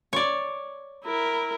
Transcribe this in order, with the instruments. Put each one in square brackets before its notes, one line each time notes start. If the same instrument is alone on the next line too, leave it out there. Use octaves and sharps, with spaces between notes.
[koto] C#5 D5
[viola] E4 A#4